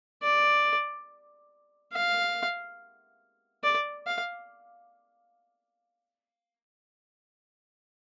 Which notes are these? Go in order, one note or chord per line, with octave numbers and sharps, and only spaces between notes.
D5
F5
D5
F5